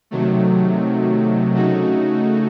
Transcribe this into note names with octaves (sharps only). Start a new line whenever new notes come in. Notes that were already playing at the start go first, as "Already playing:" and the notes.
C3 D#3 F#3 A3
C#3 A3 D#4 F#4